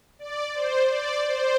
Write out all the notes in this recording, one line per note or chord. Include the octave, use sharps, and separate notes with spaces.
D5
C5
D5
C5